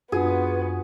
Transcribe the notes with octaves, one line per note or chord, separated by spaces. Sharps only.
F#2 B3 D4 F4 F#4 G#4